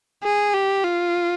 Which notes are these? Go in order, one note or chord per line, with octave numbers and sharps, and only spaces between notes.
G#4
G4
F4